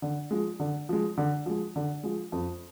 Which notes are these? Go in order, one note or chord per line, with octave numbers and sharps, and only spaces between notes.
D3
F3 G#3
D3
F3 G#3
D3
F3 G#3
D3
F3 G#3
F2